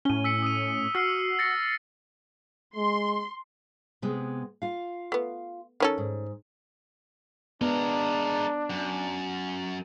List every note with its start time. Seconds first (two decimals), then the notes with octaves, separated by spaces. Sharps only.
0.05 A2 C#4 D#7 G7
0.24 E6 B6 C#7
0.42 D#6 E6 D#7
0.95 F#4 E6 F6 C7
1.39 A6 A#6 C#7
2.76 G#3 C6
4.02 C3 G#3 B3
4.62 F4 F5
5.12 A3 B3
5.80 D#3 C#4 A4
5.98 G#2
7.61 G#3 B3 D4 A#4
8.70 F#2